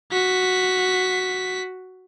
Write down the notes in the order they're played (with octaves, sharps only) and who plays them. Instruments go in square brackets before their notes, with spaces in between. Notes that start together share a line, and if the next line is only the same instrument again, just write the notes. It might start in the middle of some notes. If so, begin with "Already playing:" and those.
[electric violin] F#4 B6